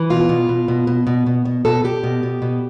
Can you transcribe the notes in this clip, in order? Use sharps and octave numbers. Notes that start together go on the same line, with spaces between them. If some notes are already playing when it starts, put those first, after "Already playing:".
Already playing: E3
B2 F4
B2
B2
B2
B2
B2
B2
B2
B2 A4
B2 G4
B2
B2
B2